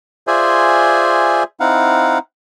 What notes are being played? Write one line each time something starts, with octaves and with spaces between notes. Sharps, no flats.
F4 G#4 C5 D5 E5 G#5
C4 D#4 E4 F5 F#5